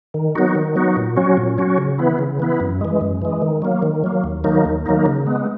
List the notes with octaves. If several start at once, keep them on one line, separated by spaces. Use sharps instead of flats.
D#3
F#3 B3 D#4 F#4
D#3
F#3 B3 D#4 F#4
A#2
F#3 C#4 F#4
A#2
F#3 C#4 F#4
C#3
E3 B3 E4
C#3
E3 B3 E4
F#2
E3 G#3
F#2
E3 G#3
D#3
F#3 A#3
D#3
F#3 A#3
D#2
D#3 F#3 A#3 D#4
D#2
D#3 F#3 A#3 D#4
C#3
G#3 B3